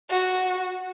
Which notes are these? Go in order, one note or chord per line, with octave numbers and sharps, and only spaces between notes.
F#4